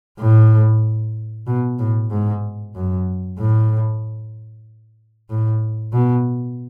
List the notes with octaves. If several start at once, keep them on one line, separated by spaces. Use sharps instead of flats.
A2
B2
A2
G#2
F#2
A2
A2
B2